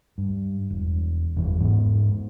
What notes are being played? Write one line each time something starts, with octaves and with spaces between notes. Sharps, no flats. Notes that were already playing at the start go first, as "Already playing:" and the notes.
G2
E1
F#1 E2 E3
G#2 B3